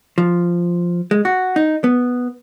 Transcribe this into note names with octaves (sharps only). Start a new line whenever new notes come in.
F3
G#3
F#4
D#4
B3